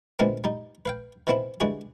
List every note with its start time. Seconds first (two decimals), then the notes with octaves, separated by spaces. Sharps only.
0.19 A#2 D3 E3 G#3 B3 C4
0.44 G3 D#4
0.86 B4 F5 G5
1.27 D#3 E3 B3 C4 E4
1.60 D3 E3 G3 G#3 F#4 G#4